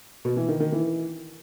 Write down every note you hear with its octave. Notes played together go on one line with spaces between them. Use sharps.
B2
E3
D#3
D#3
E3